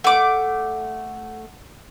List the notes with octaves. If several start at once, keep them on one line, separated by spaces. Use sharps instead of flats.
A3 F#5 D6